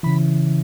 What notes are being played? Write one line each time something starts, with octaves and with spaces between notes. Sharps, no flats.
C#3 E3 B5